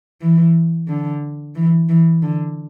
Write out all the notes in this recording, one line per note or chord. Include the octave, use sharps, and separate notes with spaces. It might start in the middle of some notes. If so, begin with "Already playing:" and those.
E3
D3
E3
E3
D3